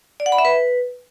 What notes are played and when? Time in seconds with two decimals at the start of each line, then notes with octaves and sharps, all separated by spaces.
0.20 D5
0.26 F#5
0.32 B5
0.38 E5
0.45 B4